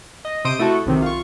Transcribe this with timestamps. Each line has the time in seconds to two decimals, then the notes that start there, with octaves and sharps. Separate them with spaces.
0.25 D#5
0.45 C3 C5 D#6 D7
0.59 A3 E4 F#4 A4
0.86 B1 C3 D#3
1.02 F4 C#6